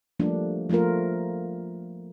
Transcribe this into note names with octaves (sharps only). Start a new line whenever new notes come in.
F3 G3 A3 A#3 D4
F3 A3 A#3 F4 A#4